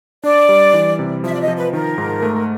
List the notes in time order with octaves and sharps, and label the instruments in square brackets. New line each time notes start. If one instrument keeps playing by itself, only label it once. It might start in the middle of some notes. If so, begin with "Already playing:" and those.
[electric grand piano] D4 [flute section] D5
[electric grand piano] G3
E3
C3
[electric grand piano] F3 [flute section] E5
[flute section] D5
D#5
[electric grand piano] F3
[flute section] B4
[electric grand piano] D#3 [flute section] A#4
[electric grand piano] G#2
A3